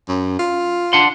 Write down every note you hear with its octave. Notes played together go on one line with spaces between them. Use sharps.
F#2
F4
D4 F#5 C6